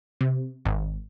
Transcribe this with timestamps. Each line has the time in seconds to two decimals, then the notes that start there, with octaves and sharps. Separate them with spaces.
0.21 C3
0.65 G#1